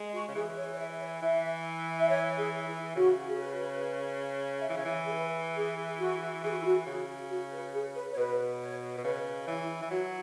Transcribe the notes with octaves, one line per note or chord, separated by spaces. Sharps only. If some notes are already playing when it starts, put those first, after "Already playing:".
Already playing: G#3
F#4
C#3
E3 G#4
C#5
C#5
E5
C#5
E3 E5
E5
C#5
G#4
E4
C#3 F#4
G#4
B4
E5
E3 C#5
C#3
E3
G#4
B4
G#4
F#4
E3 G#4
F#4
E4
F#4
C#3 G#4
F#4
B4
G#4
B4
C#5
B2 B4
C#5
B2
C#3 B4
E3 E4
E3
F#3 F#4